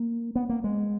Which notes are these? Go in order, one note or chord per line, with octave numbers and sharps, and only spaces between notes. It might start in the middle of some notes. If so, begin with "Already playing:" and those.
Already playing: A#3
B3
A#3
G#3